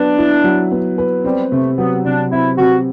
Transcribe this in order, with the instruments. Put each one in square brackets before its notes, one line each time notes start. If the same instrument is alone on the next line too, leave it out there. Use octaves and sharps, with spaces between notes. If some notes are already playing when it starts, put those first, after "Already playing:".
Already playing: [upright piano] F#3 B3 B4 [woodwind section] D4
[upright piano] E4
F#3
B3
B4
[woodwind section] G3 [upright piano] C4
[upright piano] C3 [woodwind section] A3
[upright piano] F#3 [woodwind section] B3
[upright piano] C3 [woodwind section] D4
[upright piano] C4 [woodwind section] E4
[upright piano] C3 [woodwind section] F#4